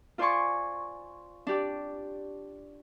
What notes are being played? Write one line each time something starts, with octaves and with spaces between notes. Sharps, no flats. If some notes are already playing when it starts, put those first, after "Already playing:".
F4 C5 D5 G#5 C6 C#6
D4 G4 D5